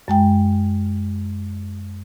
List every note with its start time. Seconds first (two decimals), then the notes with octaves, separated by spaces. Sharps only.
0.08 F#2 G#3 G5